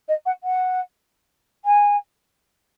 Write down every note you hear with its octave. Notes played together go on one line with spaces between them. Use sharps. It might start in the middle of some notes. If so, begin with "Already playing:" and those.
D#5
F#5
F#5
G#5